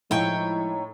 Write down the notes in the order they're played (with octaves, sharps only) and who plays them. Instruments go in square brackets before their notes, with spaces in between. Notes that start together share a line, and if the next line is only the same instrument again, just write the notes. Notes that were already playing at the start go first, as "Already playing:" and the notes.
[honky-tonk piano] A2 [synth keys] F3 G#3 E4 [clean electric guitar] D#4 [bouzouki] C#5 G5